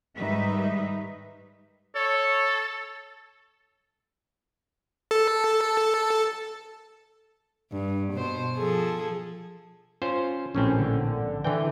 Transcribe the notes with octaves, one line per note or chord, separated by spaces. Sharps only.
G#2 D#3 G3 D#4 B4 E5
A4 C#5
A4
G2
B2 C5
F3 G#4 A4
C#4 F4 C5
A#1 A2 C4 C#4
D3
D3 E3 G5